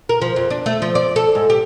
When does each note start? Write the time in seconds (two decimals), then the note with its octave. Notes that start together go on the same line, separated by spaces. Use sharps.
0.09 A#4
0.22 F3
0.36 F2
0.50 D4
0.66 A3
0.82 F3
0.95 D5
1.16 A4
1.35 G#2
1.50 G4